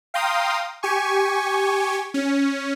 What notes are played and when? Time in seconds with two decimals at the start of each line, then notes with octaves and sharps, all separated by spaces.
0.14 F5 G5 A#5 C6 D#6
0.83 G4 G#5 C#6
2.14 C#4